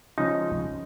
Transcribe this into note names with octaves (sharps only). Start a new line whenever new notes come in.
C#3 F3 G#3 C#4 D#4